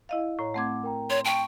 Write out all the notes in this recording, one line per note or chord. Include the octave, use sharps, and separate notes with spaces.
E4 D#5 F5
A2 C#5 A#5
A3 C4 F#5 D6 G#6
A#4 G5 A#5
C#5 C6
G5 A5 C#6